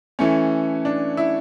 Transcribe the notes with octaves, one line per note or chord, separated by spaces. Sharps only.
E3 A3 C#4
D4
E4